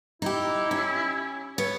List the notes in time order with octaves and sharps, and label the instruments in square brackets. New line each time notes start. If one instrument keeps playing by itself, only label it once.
[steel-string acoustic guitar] D#4 G4 [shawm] E4
[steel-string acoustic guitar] C#4
[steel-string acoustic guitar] B3 [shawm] C#5